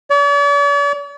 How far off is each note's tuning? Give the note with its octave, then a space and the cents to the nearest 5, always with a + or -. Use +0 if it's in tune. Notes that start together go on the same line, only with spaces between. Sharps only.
D5 -45